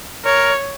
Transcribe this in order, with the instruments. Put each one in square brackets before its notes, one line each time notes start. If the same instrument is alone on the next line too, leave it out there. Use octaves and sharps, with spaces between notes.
[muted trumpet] A#4 [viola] C#5